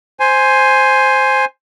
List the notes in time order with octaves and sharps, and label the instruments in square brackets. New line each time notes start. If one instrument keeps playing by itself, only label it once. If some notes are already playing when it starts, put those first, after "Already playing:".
[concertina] C5 G#5